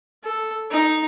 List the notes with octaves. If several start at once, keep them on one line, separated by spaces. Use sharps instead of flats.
A4
D#4